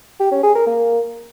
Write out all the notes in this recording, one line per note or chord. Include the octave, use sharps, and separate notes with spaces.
G4
C#4
G#4
A#4
A#3